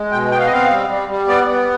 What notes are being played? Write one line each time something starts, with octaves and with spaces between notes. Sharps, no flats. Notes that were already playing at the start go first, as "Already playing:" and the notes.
Already playing: G#3
B2 G5
B3 G5
F5
D#5
C4 F5
G3
G3
G3
B3 D5
B3